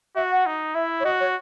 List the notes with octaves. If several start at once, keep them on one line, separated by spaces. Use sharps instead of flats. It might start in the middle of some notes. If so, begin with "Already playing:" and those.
F#4 E5
F#5
D#4
E4 E5
C#5
F#4 D#5
C#5